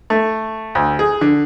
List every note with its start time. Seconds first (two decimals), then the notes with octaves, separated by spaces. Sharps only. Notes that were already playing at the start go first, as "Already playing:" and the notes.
0.10 A3
0.75 D2
0.99 G#4
1.21 D3